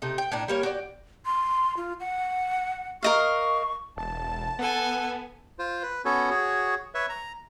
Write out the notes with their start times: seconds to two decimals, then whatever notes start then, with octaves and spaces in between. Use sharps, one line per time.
0.02 C3 A3 D#4
0.18 G5
0.32 A2 D4 D#4
0.48 G3 A#3 C#5
0.63 F#4 G4 D5
1.25 C6
1.77 F4
2.00 F#5
3.03 A#4 D#5 F5 C#6
3.97 E1 A5
4.59 B3 A4 F#5 G#5
5.59 F4 C5
5.83 B4
6.05 B3 C#4 F#4 A4 C#5
6.30 F#4 G#4 C#5
6.94 B4 C#5 E5
7.09 A#5